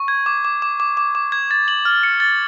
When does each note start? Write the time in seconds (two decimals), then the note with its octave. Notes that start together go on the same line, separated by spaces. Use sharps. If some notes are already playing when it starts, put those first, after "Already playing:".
Already playing: C#6
0.08 G#6
0.26 D6
0.45 D6
0.62 D6
0.80 D6
0.97 D6
1.15 D6
1.32 G#6
1.51 A6
1.68 F#7
1.85 F6
2.03 C#7
2.20 A6